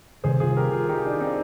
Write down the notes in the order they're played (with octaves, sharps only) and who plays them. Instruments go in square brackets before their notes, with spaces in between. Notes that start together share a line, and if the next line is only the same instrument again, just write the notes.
[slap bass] C3 D#3 G3 [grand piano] G#4 C5
[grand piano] F4 G#4
G4 A#4
F4 G#4
D#4 G4
D4 F4
C4 D#4